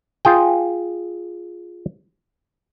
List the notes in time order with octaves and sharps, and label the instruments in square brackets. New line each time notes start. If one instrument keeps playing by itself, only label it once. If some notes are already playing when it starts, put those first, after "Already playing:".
[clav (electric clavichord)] F4 G#4 G5